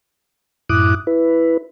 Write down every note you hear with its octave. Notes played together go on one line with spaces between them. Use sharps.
F#2 A2 E4 D6 D#6 F#6
E4 B4